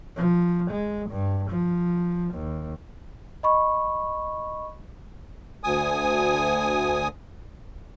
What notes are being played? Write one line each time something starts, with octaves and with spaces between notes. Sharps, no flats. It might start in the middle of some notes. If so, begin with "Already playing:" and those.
F3
G#3
G2
F3
D#2
D#5 B5 C#6
D2 G#5 D#6